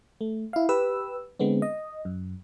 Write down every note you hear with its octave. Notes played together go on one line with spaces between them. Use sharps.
A3
E4 F5
G4 B4 E6
D3 G#3 B3 C4
D#5
F#2